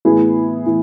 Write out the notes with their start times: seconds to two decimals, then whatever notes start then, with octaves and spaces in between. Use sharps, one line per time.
0.05 A2 E3 B3 E4 G#4
0.66 A2 E3